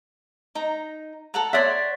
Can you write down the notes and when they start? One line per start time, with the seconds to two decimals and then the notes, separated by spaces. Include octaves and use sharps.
0.55 D#4 A#5
1.34 A4 F#5 A#5
1.53 C#5 D5 E5 F#5 C6